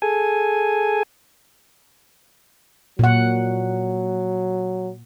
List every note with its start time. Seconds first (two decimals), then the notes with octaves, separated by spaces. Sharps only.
0.02 G#4 A4 G#5
2.99 A#2 F#3 F#5